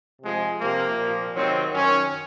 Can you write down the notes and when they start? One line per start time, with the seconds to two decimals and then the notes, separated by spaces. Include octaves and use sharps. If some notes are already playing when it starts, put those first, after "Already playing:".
0.22 C3 F3 G#3
0.59 C3 F3 A#3
0.97 A#2 F3
1.35 C3 D#3 F#3 C4
1.73 F#2 D#3 F#3 C#4